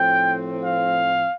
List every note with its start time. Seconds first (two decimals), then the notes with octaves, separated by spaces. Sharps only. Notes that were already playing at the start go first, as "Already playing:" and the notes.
Already playing: A2 F3 C4 G5
0.64 F5